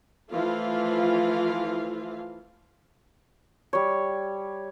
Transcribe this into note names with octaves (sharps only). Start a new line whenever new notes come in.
E3 F3 A3 F4 F5
G3 C#5